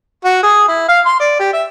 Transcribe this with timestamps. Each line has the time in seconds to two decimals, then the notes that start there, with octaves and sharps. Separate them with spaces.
0.25 F#4
0.43 G#4
0.68 E4
0.88 F5
1.05 C6
1.20 D5
1.39 G4
1.53 E5